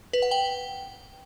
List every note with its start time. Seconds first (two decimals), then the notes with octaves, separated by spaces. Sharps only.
0.13 B4
0.22 F#5
0.31 G5